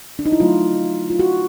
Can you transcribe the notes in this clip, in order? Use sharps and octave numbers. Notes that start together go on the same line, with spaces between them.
D4
D#4
E4
D3 F#3 A3 F4
F4
F#4